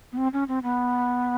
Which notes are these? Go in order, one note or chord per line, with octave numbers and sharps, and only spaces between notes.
B3
C4
C#4
C4
B3